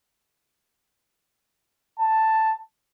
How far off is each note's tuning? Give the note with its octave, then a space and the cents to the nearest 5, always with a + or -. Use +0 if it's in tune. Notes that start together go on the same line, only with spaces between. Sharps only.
A5 +5